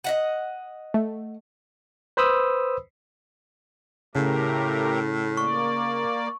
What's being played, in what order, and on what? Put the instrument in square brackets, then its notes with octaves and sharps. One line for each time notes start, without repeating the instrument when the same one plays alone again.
[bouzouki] D#5 E5 F#5
[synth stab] A3
[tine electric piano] B4 C5 B5 D#6 E6
[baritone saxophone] A2 [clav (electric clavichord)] C#3 [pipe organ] A3 G4 A#4
[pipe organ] A#3 D5 [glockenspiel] C#6